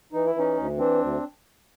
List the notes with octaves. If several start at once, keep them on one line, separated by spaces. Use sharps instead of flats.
E3 D#4
E4
E3 C#4 D#4
D2
E3 C4 D4
D2